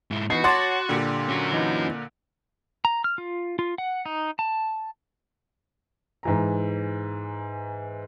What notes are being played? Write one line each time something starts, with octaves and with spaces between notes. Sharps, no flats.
G#2 E4
E3 B3 D#4 F#4 C7
C#5 F#5 A5 C6 D6 A6
A#2 D3 G3
C#4 F#4
E3 D#4
A#5
F6
F4
F4
F#5
D#4
A5
G#2 E3 A#5